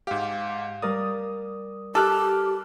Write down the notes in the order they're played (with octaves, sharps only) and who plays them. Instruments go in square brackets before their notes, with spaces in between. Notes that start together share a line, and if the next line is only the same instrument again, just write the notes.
[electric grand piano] G#2 G4 [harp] F5
[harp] G3 A#4 D5 [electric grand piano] D#6
[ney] G4 [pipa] A4 [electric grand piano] D6 F6 F#6